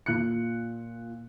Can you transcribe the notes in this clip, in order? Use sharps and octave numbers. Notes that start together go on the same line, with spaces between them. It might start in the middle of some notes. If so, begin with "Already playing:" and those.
A#2 F#6 C#7